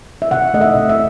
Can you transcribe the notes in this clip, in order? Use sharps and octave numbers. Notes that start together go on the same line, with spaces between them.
E5
C3 F#5
A3 D#5
E5
C3
E5